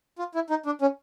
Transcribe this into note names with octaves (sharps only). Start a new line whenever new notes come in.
F4
E4
D#4
D4
C#4